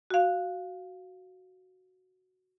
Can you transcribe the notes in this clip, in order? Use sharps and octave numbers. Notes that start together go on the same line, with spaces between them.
F#4 F5